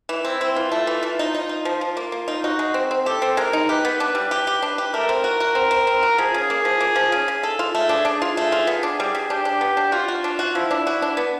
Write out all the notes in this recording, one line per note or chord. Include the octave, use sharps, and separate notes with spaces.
E3
C4 E4
C4
E3 F4
A3
E3
E3
D#4
D#4
D#4
F3
F3
A#3
A#3
D#4
D#4 F#4
G#3
C4
C4
G4 A4
C4
G#3 A#4
D#4
G4 B4
B3
D4
G3
G4
G4
D4
G4
A3 A#4
C4
F#4
F#4
C4
C4
C4
F#4
F3 G#4
C#3
A#3
F3
A#3
F3
C#3
C#3
A4
F4
A3 G#4
D4
D4
F4
A3
F4
B3
D4
G3
G3
D4 G4
D4
B3
D4
F4 F#4
F#4
D4
F#4
F3 E4
D4
F#4
D4
B3